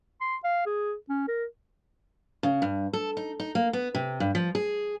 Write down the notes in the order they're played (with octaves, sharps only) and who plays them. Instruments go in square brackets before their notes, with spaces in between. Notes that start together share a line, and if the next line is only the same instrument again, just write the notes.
[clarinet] C6
F5
G#4
C#4
A#4
[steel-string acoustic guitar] C#3
G2
A4
D#4
D#4
A#3
B3
C3
G2
F3
G#4